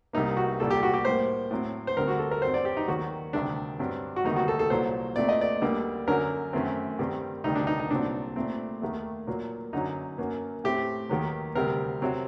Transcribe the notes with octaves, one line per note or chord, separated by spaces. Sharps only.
C2 C3 G3 A#3 D#4
F#4
C2 A#2 G3 A4
G4
F#4
G4
A2 G3 A#3 C5
A2 F#3 C4
C5
D2 D3 G3 C4 A#4
F#4
A4
A#4
G2 F#3 C4 C5
D5
G4
D#4
D#2 D#3 F#3 F#4
D2 C3 D#3 G3 D4
G2 F#3 C4
F#4
D2 C3 D#3 G3 A#3 D#4
F#4
A4
A4
C2 A#2 F#3 C5
A#2 A3 C4 D5
D#5
D5
D2 D3 G3 A#3
F#2 D3 F#3 A#4
F#2 D#3 A3 C4
G2 D#3 G3 C4
D2 C3 D#3 G3 D#4
D4
D#4
D#4
C2 A#2 F#3 C4 D4
A#2 A3 C4
D#2 D#3 A3
A#2 F#3 A#3
F#2 D3 F#3 D#4
F#2 F#3 A#3
A2 A3 C4 G4
D#2 D#3 F#3
D2 C3 G3 C4 A#4
C3 F#3 C4